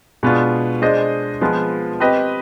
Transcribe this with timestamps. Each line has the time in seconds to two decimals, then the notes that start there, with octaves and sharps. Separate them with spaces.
0.23 B2 G#3 B3 D4 F4
0.82 G#3 D4 G#4 C5 D#5
1.41 F3 G#3 B3 F4
2.00 C4 G4 B4 D#5